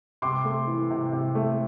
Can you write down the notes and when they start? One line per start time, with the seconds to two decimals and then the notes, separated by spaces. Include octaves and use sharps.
0.22 C3 C6 D6
0.45 A3
0.67 E3
0.90 C3
1.13 C3
1.35 A3